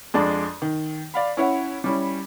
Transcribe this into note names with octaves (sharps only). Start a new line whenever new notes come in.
F2 G#3 D4 D5 A5
D#3
D5 F5 B5
C#4 E4 C#5 F#5
G3 C#4 E4